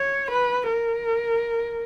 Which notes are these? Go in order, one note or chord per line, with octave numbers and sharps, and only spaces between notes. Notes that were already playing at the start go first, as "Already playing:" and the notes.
Already playing: C#5
B4
A#4